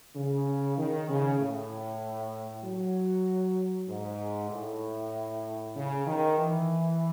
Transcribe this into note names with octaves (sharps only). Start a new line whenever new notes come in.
C#3
D#3
C#3
A2
F#3
G#2
A2
C#3
D#3
E3